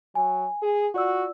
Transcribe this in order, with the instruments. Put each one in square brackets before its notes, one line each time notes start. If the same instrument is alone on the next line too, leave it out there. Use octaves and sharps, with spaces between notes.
[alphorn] F#3 [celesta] G#5
[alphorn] G#4
[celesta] F4 D5 E6 [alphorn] F#4